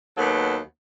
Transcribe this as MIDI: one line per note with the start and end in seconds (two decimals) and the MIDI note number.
0.17 0.57 39
0.17 0.57 54
0.17 0.57 59
0.17 0.57 69